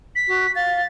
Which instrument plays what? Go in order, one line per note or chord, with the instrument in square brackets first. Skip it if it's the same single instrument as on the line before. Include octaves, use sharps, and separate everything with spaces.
[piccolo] B6
[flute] F#4
[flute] F5 [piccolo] A6